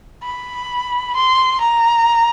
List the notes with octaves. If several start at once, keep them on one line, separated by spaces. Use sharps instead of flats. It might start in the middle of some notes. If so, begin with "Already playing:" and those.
B5
C6
A#5